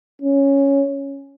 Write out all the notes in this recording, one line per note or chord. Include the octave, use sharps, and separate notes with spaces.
C#4